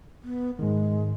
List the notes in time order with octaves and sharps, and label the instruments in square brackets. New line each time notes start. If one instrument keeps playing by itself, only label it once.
[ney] B3
[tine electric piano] G#2 D#3 [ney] G#3